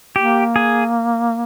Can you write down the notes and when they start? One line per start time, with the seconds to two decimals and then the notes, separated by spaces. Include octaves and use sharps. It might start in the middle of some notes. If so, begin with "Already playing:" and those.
0.16 A#3 G4
0.56 G#4